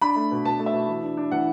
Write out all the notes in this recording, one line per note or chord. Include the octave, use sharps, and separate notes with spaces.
D4 B5
A3
B2
B2 A5
A3
E5
B2
E3
D4
D4
E3 F#5